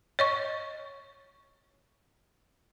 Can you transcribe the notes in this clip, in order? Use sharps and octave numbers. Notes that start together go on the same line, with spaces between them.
C#5 D#5 C#6